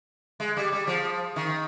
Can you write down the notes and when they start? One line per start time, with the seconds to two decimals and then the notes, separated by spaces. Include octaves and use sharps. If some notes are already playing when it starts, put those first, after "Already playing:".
0.40 G#3
0.57 G3
0.72 G3
0.87 F3
1.36 D#3